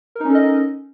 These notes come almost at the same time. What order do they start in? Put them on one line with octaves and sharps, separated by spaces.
A#4 D#4 C#4 A4 D#5